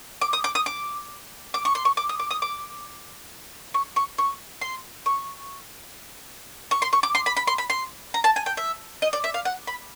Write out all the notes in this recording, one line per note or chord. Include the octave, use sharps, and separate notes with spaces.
D6
D#6
D6
D#6
D6
D6
C#6
C6
C#6
D6
D#6
D6
D#6
D6
C#6
C#6
C#6
C6
C#6
C#6
C6
C#6
D6
C6
B5
B5
C6
B5
C6
A#5
A5
G#5
G5
E5
D#5
D5
E5
F5
F#5
B5